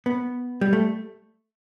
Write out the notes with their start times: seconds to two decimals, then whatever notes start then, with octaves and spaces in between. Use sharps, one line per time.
0.06 B3
0.61 G3
0.73 A3